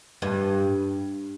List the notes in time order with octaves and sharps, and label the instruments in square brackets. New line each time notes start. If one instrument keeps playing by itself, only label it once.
[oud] G2